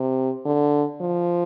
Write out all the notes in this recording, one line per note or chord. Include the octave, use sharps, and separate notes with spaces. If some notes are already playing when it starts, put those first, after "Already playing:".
Already playing: C3
D3
F3